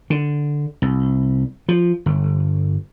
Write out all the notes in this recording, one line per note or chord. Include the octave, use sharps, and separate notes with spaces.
D3
C2
F3
G1